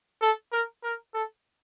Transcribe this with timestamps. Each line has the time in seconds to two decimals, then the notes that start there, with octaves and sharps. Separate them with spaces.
0.22 A4
0.52 A#4
0.84 A#4
1.14 A4